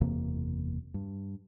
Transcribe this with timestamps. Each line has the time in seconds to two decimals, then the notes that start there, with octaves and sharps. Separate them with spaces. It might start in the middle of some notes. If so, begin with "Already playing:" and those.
0.01 F#1 E2 C3 A#3
0.94 G2